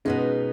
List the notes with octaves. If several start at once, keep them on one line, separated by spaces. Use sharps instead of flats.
B2 G#3 B3 C#4 D#4